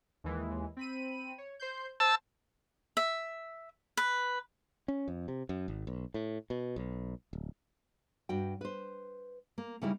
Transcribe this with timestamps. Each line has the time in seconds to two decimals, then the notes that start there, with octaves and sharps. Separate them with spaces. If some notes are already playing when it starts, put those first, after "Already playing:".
0.24 D#2 E3 G#3
0.77 C4 B5 D#7
1.38 C#5
1.60 C5 C6 G6
2.00 C5 A5 E6
2.97 E5
3.97 B4
4.88 C#4
5.08 F2
5.28 C3
5.49 F#2
5.68 G#1
5.87 B1
6.14 A2
6.50 B2
6.76 B1
7.33 D1
8.29 G2 F#4 G5
8.61 B4 C5
9.58 A#3
9.82 C#3 G3 A#3 D#4 E4 A#4